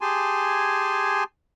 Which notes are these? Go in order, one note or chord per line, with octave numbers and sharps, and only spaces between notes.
G4 G#4 G#5 A5 C6